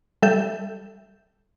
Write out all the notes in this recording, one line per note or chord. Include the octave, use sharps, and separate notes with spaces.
G3 A4 E5 G6